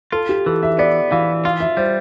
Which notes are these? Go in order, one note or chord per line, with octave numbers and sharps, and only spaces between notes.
F4 A4
G4
E3 A4
E5
B3 D5
E3 F5
F4 F5
E5
G3 C5